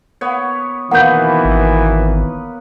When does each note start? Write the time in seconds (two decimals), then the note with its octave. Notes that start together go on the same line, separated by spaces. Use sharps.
0.21 B3 C#5
0.91 B2 D#3 E3 A#3 B3 B4 F#5 G6
1.45 G#1